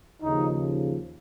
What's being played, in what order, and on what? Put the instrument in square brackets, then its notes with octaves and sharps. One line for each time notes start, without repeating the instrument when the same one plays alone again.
[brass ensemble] D#2 C#3 F3 D#4